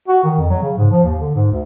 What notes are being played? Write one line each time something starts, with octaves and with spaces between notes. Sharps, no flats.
F#4
D#3
F2
F#3
C#3
G#2
F3
D#2
D3
G#2
D2